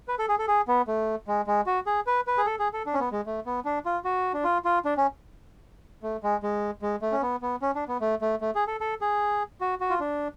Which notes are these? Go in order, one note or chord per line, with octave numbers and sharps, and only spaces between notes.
B4
A4
G#4
A4
G#4
B3
A3
G#3
G#3
F#4
G#4
B4
B4
G#4
A4
G#4
A4
D4
C#4
B3
G#3
A3
B3
D4
F4
F#4
D4
F4
F4
D4
C#4
A3
G#3
G#3
G#3
A3
C#4
B3
B3
C#4
D4
B3
A3
A3
A3
G#4
A4
A4
G#4
F#4
F#4
F4
D4